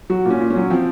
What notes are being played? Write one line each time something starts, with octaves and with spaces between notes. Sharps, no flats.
F#3 F#4
A#2
C#4
A#2
C#4
F#3
F3 C4